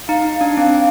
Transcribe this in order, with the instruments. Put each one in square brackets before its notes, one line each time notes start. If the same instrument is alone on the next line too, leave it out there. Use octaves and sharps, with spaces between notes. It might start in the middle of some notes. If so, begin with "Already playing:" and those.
[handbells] D#4 [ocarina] F5
[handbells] D4
[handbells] C4 [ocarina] F5